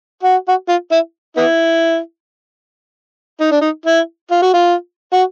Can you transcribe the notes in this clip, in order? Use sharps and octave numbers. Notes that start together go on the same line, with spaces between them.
F#4
F#4
F4
E4
B3 E4
D#4
D4
D#4
E4
F4
F#4
F4
F#4